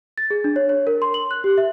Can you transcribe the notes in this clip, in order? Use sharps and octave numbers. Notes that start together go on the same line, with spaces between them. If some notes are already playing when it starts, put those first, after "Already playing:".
A6
G#4
D4
C#5
C#5
A#4
C6
F#7
F#6
G4
E5